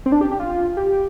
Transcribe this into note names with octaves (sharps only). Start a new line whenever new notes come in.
C4
D4
G4
G4
F4
G4